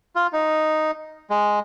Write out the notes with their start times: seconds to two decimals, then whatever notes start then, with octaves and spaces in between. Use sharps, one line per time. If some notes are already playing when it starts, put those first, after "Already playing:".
0.15 F4
0.33 D#4
1.30 G#3